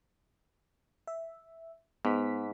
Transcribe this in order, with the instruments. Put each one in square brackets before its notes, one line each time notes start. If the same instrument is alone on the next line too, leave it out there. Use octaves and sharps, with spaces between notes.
[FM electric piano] E5
[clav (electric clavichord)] G#2 [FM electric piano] B3 B6